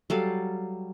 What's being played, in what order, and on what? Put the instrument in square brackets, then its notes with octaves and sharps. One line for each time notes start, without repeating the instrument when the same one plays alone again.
[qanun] F#3 G3 A4 F5